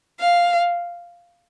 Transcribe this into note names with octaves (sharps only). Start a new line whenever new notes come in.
F5